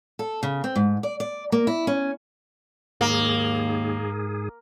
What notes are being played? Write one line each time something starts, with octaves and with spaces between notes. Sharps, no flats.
A4
C#3
C4
G#2
D5
D5
A#3
E4
C#4
D#2 G#2 A#3 G#4